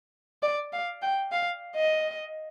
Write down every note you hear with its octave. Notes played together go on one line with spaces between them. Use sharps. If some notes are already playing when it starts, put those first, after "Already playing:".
D5
F5
G5
F5
D#5